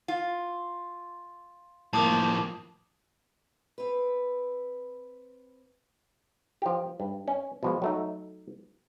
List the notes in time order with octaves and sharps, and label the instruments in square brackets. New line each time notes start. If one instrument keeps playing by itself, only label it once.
[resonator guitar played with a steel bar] F4
[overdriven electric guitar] A2 F3 [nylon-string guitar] A3 A#3 [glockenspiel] A5 D6 D#6
[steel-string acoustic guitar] C4 B4
[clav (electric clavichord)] F3 G4
G2
C#4
B2 F3 G#3
F#3 A3 D#4